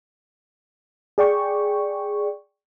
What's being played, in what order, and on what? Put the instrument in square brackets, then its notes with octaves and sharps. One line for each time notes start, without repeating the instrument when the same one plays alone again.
[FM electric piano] G#4 D5 G5 C#6